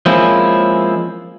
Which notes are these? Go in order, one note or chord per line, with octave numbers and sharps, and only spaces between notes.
F3 G#3 A#3 C4 C#4 E4